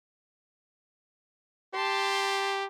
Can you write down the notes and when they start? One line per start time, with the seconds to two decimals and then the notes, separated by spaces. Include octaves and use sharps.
1.74 G4 A5 C6